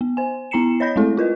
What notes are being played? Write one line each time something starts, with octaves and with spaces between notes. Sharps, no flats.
B3
C5 G#5
B3 E4 A#5 C7 C#7 E7
C#5 D#5 B5 G6 A#6
G#3 A3 C4 E4 A4
F4 A#4 B4 D#5